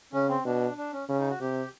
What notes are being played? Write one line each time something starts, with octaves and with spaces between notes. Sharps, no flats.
C#3 C#4
C4
B2 D4
D4
C#4
C#3 C#4
D#4
F#4
C3 G4